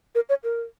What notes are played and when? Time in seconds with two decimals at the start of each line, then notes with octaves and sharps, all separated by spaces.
0.15 A#4
0.29 C#5
0.44 A#4